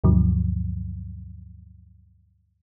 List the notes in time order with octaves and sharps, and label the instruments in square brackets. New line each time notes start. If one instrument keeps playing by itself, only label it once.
[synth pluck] D2 G2 B2 D3 F3 F#3